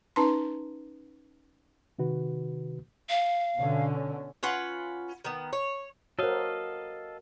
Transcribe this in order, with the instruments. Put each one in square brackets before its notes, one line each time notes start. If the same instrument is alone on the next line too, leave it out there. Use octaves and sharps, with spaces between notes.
[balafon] C#4 D#4 B4 A5 A#5 C6
[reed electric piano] C3 D#3 F#4 B4
[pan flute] F5
[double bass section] B2 D3 C#4
[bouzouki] C#4 F4 B4 F#5
D#3 B3
C#5
[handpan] F#4 A#4 [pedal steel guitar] A4 D#5 F5 [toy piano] C5 C#5